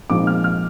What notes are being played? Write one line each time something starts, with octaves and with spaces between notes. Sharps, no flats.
A#2 F3 G#3 C4 D#4 D6
F6
F6